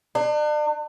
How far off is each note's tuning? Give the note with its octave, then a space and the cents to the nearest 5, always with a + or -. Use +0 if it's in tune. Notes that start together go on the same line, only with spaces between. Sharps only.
D4 +40